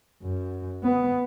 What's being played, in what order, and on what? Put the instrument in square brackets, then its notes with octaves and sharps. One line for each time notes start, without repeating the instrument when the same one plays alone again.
[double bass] F#2
B3